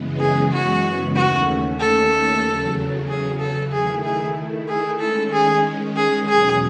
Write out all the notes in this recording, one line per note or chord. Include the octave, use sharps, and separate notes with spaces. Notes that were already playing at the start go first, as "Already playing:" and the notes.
Already playing: F#2 C#3 E3 G#3 B3
G#4
F#4
D#2 D#3 A3 C#4 F#4
A4
E2 C#3 F#3
G#4
A4
D#3 A3 E4 G#4
G#4
G#4
D#3 G#3 C#4 A4
G#4
G#4
E2 B2 F#3 C#4 G#4